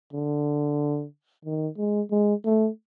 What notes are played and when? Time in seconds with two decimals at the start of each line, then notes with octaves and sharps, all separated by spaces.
0.13 D3
1.45 D#3
1.78 G#3
2.11 G#3
2.45 A3